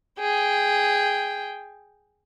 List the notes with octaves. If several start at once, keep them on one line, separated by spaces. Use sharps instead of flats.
G#4 G5